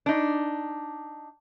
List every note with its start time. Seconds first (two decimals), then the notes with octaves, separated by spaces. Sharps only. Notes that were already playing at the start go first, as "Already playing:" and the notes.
0.06 D4 D#4